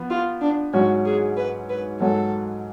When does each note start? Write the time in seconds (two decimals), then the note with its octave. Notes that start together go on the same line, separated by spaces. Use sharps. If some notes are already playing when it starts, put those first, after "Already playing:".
Already playing: F3 B3
0.10 F4
0.41 D4
0.73 G#2 F#3 C#4 F#4
1.05 G#4
1.37 B4
1.69 B4
2.01 G#2 F#3 C#4 A4